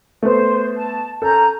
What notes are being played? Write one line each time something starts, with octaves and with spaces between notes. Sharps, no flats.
A3 B3 C5
A5
C#4 A4 A#5 G6